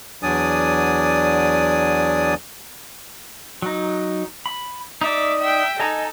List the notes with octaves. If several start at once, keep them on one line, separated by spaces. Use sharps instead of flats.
E2 F#3 D4 D5 G#5 D#6
F#3 D#4
B5
D#4 D5 E5 D6
E5 G5
D#4 A4 D#5 G#5 A#5